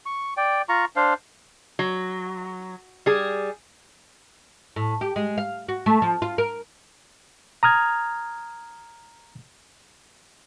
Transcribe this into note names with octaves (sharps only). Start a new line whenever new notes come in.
C#6
D5 G5
F4 A#5 C#6
D4 C5 F5
F#3
G3 G#4
A2
G4
G#3
F5
F#4
A3
F3
F4
A#4
A#5 D#6 F6 G#6